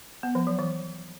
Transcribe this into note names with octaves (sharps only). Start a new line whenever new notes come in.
B3
F3
F#3
E3